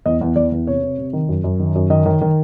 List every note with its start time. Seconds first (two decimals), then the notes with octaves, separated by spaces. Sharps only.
0.06 E2 D#5
0.21 E2
0.36 E2 D5
0.52 E2
0.67 C3 C#5
0.83 C3
0.98 C3
1.13 D#3
1.29 F#2
1.44 F#2
1.60 D#3
1.75 F#2
1.90 D#3 D#5
2.06 D#3
2.21 D#3